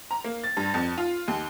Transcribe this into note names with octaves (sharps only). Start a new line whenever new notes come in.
A#5
A#3
A6
G2
F2
F4
D#2